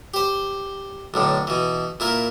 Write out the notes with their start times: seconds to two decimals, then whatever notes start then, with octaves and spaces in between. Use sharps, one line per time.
0.14 G4 C5
1.14 B1 A2 D3
1.47 B2 E3
2.00 A#2 E4 A#4